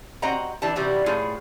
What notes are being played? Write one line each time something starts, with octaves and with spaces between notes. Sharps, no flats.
C4 F#4 D#5 F#5 A#5
E3 G3 D4 A5
C3 E3 G3 F#4
A2 F4 G#4